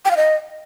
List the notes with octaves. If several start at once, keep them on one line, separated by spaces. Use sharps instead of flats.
G5
F5
D#5